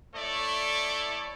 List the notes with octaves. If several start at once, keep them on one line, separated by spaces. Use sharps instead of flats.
A3 E4 A4 C#5 D5 C#6